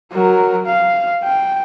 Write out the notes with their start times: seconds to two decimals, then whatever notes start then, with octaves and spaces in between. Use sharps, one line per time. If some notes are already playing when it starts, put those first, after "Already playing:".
0.12 F#3 A#4
0.66 F5
1.24 G5